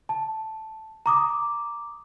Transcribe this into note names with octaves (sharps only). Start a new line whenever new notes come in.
A5
A#5 D6 D#6